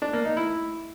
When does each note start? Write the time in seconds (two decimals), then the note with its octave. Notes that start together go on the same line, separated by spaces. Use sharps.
0.02 D4
0.13 A#3
0.25 D#4
0.37 E4